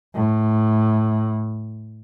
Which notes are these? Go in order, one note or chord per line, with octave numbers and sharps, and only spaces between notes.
A2